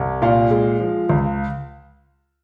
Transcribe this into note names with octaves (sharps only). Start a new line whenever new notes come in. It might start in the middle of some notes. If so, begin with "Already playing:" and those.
Already playing: C2
A#2 F5
G#3
F3
C#2